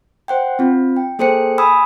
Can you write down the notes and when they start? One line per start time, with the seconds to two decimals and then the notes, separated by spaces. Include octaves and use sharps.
0.28 C5 F#5 G5
0.59 C4 F4
0.96 G5
1.19 A#3 G#4 A4 C5 G5 C#7
1.58 G#5 B5 D#6 E6